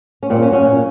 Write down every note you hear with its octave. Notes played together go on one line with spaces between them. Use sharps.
C#4
A#2 C4
C#4
F#3
C#4
A#2